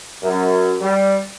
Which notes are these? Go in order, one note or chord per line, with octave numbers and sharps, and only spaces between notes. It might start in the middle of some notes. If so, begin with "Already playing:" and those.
F#2
G3